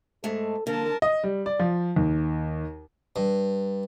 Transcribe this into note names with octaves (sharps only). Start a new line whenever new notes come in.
G#2 G#3 A3 A4
D3 A#3 A#4 A5
D#5
G3
D5
F3
D#2
G2